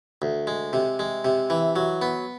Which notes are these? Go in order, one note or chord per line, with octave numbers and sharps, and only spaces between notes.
D2
G#3
C3
G#3
C3
E3
F#3
B3